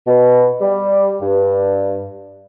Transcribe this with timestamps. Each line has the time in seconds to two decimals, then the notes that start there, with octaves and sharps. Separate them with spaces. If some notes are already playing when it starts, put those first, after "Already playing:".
0.07 B2
0.61 G3
1.21 G2